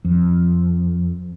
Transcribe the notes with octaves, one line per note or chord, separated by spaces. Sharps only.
F2